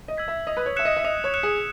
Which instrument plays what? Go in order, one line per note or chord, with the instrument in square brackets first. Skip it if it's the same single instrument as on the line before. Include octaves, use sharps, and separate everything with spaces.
[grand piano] D#5
[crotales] E6 G#6 B6
[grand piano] E5
[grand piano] D#5 [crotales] D#6
[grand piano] B4
C#5
[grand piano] E5 [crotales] F#6 C#7 E7
[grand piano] D#5
E5
[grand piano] D#5 [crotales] D#6
[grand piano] C#5
[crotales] F#6 C#7 E7
[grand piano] G#4